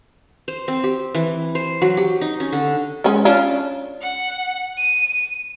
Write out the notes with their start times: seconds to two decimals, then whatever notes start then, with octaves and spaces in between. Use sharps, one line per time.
0.48 C5
0.68 C4
0.84 G4
1.15 E3
1.55 C5
1.82 F#3
1.97 G4
2.21 D#4
2.40 C#4
2.53 D3
3.04 G#3 C#4
3.25 C#4 D4 F4
4.01 F#5
4.77 D#7